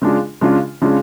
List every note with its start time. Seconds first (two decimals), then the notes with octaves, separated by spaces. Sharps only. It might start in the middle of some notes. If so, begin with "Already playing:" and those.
0.02 C#3 G#3 D4 F4
0.41 C#3 G#3 D4 F4
0.82 C#3 G#3 D4 F4